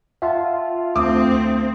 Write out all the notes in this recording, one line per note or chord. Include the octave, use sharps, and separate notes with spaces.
F4 E5 F#5 A5
D2 C4 D6 D#6